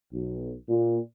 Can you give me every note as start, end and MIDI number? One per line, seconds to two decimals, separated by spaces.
0.13 0.53 35
0.69 0.99 46